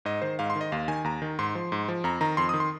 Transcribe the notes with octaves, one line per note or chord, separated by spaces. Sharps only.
G#2 D#5
D#3 C5
G#2 F5
C6
D#3
D#5
D#2 F5
D#3 G#5
D#2 A#5
D#3
G#2 C6
F3
G#2
F3
F2 A#5
D#3 A#5
F2 C6
D#6
D#3
C6